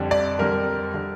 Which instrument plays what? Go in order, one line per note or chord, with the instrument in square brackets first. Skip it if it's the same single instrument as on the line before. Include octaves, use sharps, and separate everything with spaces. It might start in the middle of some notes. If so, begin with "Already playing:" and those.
Already playing: [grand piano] F2 D3 G3
D5
F2 D3 G3 A#4
D3 G3